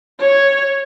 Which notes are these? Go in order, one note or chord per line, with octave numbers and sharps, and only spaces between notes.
C#5